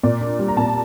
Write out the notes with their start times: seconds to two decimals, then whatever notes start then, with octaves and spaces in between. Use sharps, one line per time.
0.03 A#2 D5
0.21 D4
0.39 G3
0.48 A#5
0.57 A#2 A5
0.66 A#5